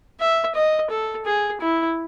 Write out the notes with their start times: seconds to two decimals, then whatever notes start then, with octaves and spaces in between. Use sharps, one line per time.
0.20 E5
0.55 D#5
0.90 A4
1.26 G#4
1.61 E4